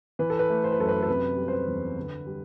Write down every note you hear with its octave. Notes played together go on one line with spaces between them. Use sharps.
E3 B4
A4
B4
A3
C5
B4
F#2 A4
B4
A4
C3 B4
G3
C5
B4
E2
D3
G3